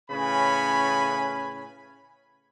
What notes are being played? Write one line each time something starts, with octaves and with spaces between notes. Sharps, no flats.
A2 C#3 C#4 B4 G#5 B5